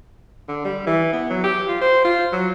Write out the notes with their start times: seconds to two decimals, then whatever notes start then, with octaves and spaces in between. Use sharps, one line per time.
0.48 D3
0.65 G3
0.87 E3
1.13 B3
1.30 F#3
1.44 G4
1.68 F4
1.81 C5
2.05 F4
2.32 F#3